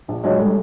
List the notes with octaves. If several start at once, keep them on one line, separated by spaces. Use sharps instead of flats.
A#1
A#1 F#3 G#3
G3 A3